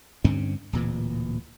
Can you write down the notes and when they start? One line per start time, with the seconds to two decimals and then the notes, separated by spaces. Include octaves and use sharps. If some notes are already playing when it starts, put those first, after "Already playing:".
0.24 G2 D3 C4 C#4
0.73 D1 A#2 E3